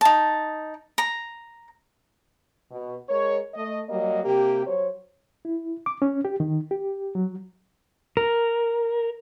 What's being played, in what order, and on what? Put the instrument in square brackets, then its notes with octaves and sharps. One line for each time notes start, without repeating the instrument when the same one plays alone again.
[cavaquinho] D#4 A5
A#5
[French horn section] B2
G#3 A#4 C#5
A3 D#5
F#3 G3 A#3 D#5
C3 A#3 G4
F#3 C5 C#5
[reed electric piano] E4
D6
C#4
G4
D#3
G4
F#3
[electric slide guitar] A#4